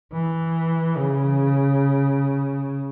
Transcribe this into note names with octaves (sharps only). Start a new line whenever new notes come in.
E3
C#3